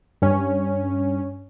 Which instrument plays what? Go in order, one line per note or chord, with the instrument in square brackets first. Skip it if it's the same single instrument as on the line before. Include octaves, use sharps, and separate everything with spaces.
[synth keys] G2 C#4